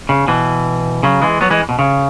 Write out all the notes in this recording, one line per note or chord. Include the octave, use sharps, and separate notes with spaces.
C#3
B2 E3
C#3 F#3
E3 G#3
F#3 B3
E3 G#3
B2
C#3